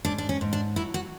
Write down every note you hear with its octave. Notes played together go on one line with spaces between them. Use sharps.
G#2 D4
D4
C#4
G#2
D4
F#3 E4
F#4